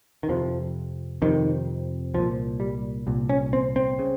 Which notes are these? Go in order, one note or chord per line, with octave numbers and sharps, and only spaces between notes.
D#3
F2 C3 F3
F2 C3 D#3
C2 A#2 F3
G3
C2 A#2
C#4
C4
C4
C#3